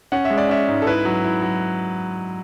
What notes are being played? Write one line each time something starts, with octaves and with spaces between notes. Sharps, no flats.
C#4 F#5
E5
G#3
D5
C#4 E5
G#2
A4
E4 B4
F#3
E4
F#3